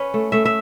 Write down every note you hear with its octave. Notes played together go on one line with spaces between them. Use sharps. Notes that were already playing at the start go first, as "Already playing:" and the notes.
Already playing: C#4 B4
A3
A3 E5
E5